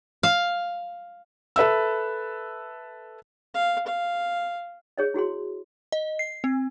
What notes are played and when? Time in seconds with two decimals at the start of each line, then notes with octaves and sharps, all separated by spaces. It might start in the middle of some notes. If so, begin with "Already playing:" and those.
0.23 F5
1.56 A4 B4 E5 E6
3.54 F5
3.87 F5
4.98 G#4 C#5 D#5
5.14 E4 F#4 G#4 C6
5.92 D#5
6.19 C7
6.44 C4